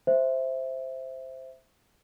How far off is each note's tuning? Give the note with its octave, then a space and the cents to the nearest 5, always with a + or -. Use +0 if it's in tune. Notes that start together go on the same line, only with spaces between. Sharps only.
C5 +0 E5 +0